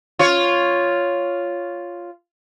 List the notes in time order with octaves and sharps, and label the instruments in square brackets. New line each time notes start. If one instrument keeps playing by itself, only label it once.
[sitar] F4 C#5